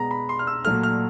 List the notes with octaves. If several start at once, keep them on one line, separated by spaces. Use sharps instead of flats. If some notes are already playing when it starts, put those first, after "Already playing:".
Already playing: B2 G#3 B3 A#5
B5
C6
F6
E6
A#2 F#3 A3 F6
F6